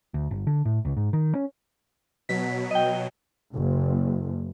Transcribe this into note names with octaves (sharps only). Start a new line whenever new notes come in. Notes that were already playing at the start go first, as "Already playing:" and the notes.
D2
G1
D3
A2
C#2
G#2
D#3
C#4
B2 F#3 B6
D#5 G5
F#1